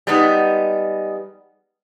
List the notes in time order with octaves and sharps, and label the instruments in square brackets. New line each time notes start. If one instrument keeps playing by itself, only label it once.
[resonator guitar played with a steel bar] G3 G#3 B3 D#4